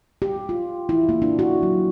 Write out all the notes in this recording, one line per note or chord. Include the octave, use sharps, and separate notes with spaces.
G4
F4
E4
A#3
D4
F#4
F#3